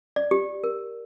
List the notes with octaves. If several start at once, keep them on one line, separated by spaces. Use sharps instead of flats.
D5
G4
A#4